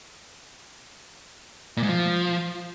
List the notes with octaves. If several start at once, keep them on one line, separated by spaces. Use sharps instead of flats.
A#2
G#2
F3